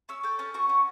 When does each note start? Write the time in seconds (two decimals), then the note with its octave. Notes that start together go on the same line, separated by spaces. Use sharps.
0.09 C#4 E6
0.23 A4 G5
0.39 C#4 A5
0.54 F#4 C#6
0.69 C#4